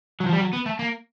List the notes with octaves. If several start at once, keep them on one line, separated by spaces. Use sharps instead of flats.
F#3
F3
G3
F#3
B3
A3
A#3